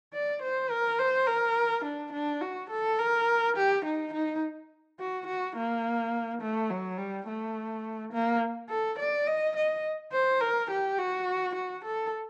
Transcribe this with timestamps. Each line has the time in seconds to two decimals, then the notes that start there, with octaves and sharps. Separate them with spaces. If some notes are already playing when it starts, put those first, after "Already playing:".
0.13 D5
0.43 C5
0.70 A#4
0.99 C5
1.27 A#4
1.84 D4
2.13 D4
2.41 F#4
2.70 A4
2.98 A#4
3.56 G4
3.85 D#4
4.13 D#4
4.99 F#4
5.27 F#4
5.56 A#3
6.41 A3
6.70 F#3
6.98 G3
7.27 A3
8.12 A#3
8.70 A4
8.99 D5
9.27 D#5
9.56 D#5
10.12 C5
10.41 A#4
10.70 G4
10.98 F#4
11.55 F#4
11.84 A4